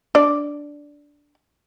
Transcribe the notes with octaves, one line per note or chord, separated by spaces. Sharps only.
D4 D5